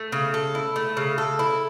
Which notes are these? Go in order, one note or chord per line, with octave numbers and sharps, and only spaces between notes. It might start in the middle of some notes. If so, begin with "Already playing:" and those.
Already playing: A3
C#3
A4
E4
A3
C#3
A4
E4